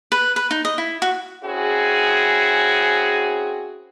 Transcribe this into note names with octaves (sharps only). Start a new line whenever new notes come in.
B4
B4
D#4
D#5
E4
F#4
C4 C#4 E4 F#4 G#4